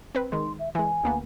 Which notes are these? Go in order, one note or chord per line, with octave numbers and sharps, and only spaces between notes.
C4 B4
D#3 G#3 C6
E5
E3 G#3 G#5
D2 A#3 B3